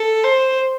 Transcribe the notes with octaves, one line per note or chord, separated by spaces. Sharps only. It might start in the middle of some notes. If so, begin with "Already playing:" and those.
Already playing: A4
C5